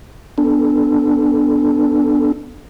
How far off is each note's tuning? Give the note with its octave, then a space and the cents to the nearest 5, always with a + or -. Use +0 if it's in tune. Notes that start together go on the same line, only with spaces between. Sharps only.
B3 +0 D4 +0 A4 +0